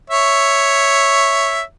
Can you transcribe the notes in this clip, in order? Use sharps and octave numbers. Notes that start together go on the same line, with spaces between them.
C#5 E5